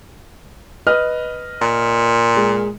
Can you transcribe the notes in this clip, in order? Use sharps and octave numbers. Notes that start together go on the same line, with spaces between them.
B4 D#5 F6
A#2
G#3